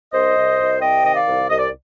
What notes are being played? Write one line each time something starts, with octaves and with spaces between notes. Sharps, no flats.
C2 C5 D#5
C2
C2
C3 D#5 G5
D#3 D#5
D5 F5
C2
C2 D#5
D5